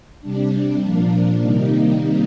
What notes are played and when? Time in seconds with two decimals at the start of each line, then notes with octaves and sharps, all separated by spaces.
0.21 C3 G3 D4
0.81 A#2 F3 A#3 D4
1.41 C3 D#3 G3 A#3 D#4